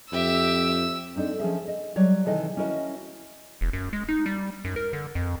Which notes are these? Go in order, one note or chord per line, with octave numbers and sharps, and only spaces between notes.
F2 G4 E5 E6
C4 D4 D#4 A4
F3 C#4 G#4 E5
D#5
F#3 G3 C#5 D5
C3 D#3 E3 A4 D#5
C#4 E4 F#4 A#4 D#5
E1
F#2
G#3
D#4
G3
F#2
A#4
D3
F2